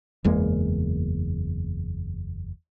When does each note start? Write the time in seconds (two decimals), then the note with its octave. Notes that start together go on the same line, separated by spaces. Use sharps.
0.24 F#1 E2 G#3 A#3